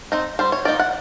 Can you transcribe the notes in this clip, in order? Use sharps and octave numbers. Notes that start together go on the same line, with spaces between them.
C4 D#4
G3 C5
C#5
A#3 D#4 D5
F#5